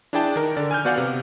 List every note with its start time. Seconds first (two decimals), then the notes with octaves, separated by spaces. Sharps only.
0.13 D4 E4 G#4 D5 G5 A5
0.36 D#3 A#4
0.57 D3 D5
0.71 G#5 F6 G6
0.85 B3 F#4 D5 F5 F#5
0.98 C3